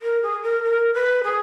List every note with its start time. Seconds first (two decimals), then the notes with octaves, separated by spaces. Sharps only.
0.02 A#4
0.22 G#4
0.42 A#4
0.63 A#4
0.93 B4
1.23 G#4